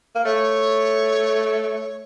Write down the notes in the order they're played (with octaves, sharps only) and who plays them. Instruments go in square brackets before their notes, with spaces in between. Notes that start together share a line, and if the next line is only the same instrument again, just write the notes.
[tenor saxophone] A#3
[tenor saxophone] A3 [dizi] C#5